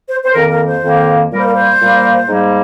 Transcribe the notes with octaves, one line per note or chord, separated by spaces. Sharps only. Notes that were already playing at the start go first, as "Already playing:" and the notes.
C5
C5
F2 D#3 A#3 A#4
A#4
C5
F2 D#3 A#3
A#2 G3 A#3 A#4
C5
A#4
C5
A#2 G3 A#3
G#2 G3 A#3